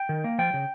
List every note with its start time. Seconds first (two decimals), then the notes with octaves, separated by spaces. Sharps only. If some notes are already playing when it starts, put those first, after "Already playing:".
Already playing: G5
0.09 D#3
0.24 A#3
0.39 F3 G5
0.54 C#3